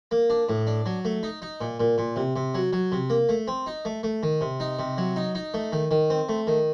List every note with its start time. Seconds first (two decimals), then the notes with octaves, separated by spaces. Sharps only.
0.11 A#3
0.30 D4
0.49 A2
0.67 D4
0.86 F#3
1.05 A3
1.23 D#4
1.42 D#4
1.61 A#2
1.80 A#2
1.98 A#2
2.16 C3
2.36 C3
2.54 F#3
2.73 F#3
2.92 C3
3.10 A#3
3.29 A3
3.48 C4
3.67 D#4
3.85 A3
4.03 A3
4.23 D#3
4.41 C3
4.60 D#4
4.79 C3
4.98 F#3
5.16 D#4
5.35 D#4
5.54 A3
5.72 D#3
5.91 D#3
6.10 C4
6.29 A3
6.47 D#3